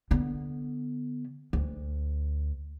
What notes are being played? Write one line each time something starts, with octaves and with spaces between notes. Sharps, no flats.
D3 B3
D2